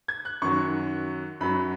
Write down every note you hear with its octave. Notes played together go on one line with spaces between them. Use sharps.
G#6
F#6
F#2 D#3 F#3 C#6
F#2 F#3 B5